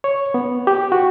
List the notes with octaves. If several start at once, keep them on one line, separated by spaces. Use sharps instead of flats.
C#5
B3
G4
F#4